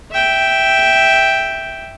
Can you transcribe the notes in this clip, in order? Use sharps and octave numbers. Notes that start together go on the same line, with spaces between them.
E5 G5